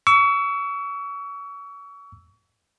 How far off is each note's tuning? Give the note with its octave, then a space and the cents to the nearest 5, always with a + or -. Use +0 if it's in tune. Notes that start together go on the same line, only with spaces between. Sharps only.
C#6 +35 E6 +0